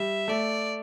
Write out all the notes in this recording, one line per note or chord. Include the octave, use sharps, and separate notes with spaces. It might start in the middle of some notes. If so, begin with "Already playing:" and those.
Already playing: G3 E5
A3 D5